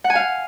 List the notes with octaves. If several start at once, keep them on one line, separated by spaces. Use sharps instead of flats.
F#5
G#5
F5